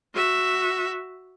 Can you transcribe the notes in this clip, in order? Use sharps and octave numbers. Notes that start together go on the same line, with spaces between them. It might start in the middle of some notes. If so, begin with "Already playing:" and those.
F#4 E5